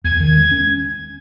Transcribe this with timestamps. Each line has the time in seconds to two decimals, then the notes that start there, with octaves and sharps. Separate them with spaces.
0.04 E2 G#6
0.20 D#3
0.36 G#3
0.51 C#4